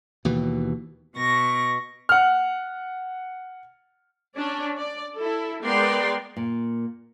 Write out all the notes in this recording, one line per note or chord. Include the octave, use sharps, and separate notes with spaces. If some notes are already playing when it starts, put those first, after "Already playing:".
D#2 B2 E3
B2 C#6 A#6
F#5 F6
C#4 D4 D5
D5
E4 A4
G#3 B3 A#4 D5 G5 C6
A#2